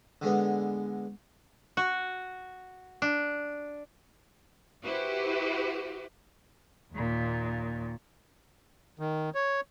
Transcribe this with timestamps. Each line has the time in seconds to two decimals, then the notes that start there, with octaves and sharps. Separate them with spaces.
0.22 D3 G#3 B3
1.77 F#4
3.02 D4
4.83 E4 F#4 G4 B4 C5
6.92 D#2 A#2
8.99 D#3
9.35 C#5